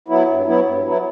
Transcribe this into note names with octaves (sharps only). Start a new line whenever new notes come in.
F#3 B3 E4
G2
F#3 B3 E4
G2
F#3 B3 E4